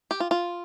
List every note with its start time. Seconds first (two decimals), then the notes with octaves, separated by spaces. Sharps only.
0.11 G4
0.20 F4
0.31 F4